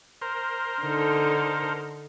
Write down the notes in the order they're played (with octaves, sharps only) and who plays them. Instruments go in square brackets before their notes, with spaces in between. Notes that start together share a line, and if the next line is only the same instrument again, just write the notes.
[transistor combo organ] A#4 C5
[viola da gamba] D3 D#4 A4